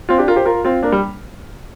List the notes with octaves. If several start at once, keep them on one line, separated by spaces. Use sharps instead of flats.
C4 F4
D4 G4
F4 A#4
G4 C5
F4 A#4
C4 F4
A#3 D4
G3